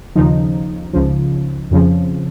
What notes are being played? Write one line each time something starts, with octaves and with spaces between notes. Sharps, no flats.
D#2 C#3 F3 D#4
C#2 C#3 F3
F2 C#3 F3